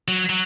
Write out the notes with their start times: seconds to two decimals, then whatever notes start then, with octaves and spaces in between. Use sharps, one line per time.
0.08 F#3
0.29 F#3